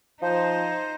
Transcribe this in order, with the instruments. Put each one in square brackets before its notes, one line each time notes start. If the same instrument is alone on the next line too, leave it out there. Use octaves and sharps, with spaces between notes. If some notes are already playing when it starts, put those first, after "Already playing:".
[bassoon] F3 [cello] D#4 [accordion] C5